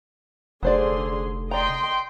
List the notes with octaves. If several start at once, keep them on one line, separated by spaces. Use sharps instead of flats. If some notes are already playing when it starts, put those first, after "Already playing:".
F1 D3 F#3 G#4 C5 D5 C6
D5 D#5 G5 A#5 C6